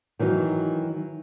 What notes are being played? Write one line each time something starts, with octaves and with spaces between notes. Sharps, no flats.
D#3 E3 F#3 D#4